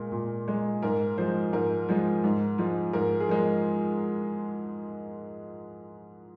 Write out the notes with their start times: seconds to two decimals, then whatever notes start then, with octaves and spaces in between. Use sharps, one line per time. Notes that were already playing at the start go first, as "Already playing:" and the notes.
Already playing: A#2 G#3 A#4
0.12 A#2
0.48 G#3
0.82 G#2 A#4
1.18 F3 G#3 C5
1.53 G#2 A#4
1.89 F3 G#3
2.24 G#2
2.58 F3 G#3
2.93 G#2 A#4
3.20 G#4
3.28 F3 G#3 A#4